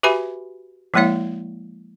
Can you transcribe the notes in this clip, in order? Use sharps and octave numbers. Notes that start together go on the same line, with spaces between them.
F#4 G4 B4 E5 G#5 B5
F3 G#3 A#3 E4 C#5 F5